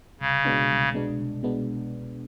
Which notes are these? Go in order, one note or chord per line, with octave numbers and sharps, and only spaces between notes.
C2 C#3
B2 G#3 B3 D4
C2
B2 G#3 B3 D4
C2
B2 G#3 B3 D4